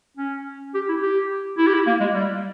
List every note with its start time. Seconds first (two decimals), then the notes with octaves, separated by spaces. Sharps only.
0.18 C#4
0.75 G4
0.89 E4
1.02 G4
1.58 E4
1.67 G4
1.74 E4
1.87 A#3
2.00 G#3
2.15 G3